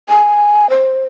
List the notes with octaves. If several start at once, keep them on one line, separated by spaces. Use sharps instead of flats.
G#5
C5